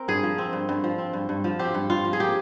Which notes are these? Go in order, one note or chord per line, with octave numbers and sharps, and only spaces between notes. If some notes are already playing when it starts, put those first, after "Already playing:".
Already playing: C4 A#4
G2 G#4
F3
C4
G2
G2
F3
C4
G2
G2
F3
C4 G4
G2
G2 F4
F3
G#4
A#3 G4